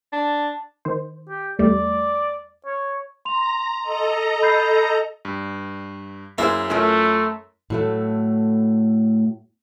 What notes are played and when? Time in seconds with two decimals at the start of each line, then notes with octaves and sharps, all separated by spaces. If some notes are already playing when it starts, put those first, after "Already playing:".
0.13 D4
0.85 D#3 C5
1.29 G4
1.59 E2 G3 A3 D5
2.66 C#5
3.25 A#5 C6 F7
3.80 A4 D#5 A#5
4.42 B5 G6 C7
5.25 G2
6.38 F#2 A#3 E4 G#4 C5
6.70 A3 C#4 F4 A#4
7.70 A2 F#3 A3